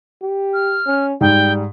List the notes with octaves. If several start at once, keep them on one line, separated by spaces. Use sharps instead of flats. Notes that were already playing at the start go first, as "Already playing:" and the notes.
G4
F6
C#4
G#2 G3 G5